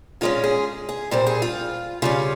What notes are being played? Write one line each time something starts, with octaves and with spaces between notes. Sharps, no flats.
A#2 G#3 C#4 F4
G#4
G#4
A#2 G3 C4 C5
G#4
F4
C#3 G3 C#4 F4